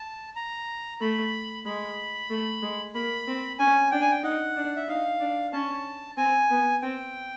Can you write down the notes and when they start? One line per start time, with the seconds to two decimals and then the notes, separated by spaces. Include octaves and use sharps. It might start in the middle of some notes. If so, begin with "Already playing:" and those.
Already playing: A5
0.36 A#5
1.01 A3 B5
1.65 G#3 B5
2.30 A3
2.63 G#3
2.95 A#3 B5
3.27 C4
3.59 C#4 G#5
3.91 D4 G5
4.01 G#5
4.11 G5
4.23 D#4 F#5
4.56 D4
4.76 E5
4.88 D#4 F5
5.20 D4
5.53 C#4 A5
6.17 C4 G#5
6.50 B3
6.82 C4 G5